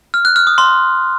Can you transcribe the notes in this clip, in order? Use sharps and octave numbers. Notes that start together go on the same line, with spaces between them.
F6
F#6
F6
D#6
C6